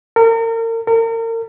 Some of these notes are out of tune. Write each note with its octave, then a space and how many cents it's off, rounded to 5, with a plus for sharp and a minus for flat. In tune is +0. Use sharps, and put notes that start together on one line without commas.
A#4 -35
A#4 -35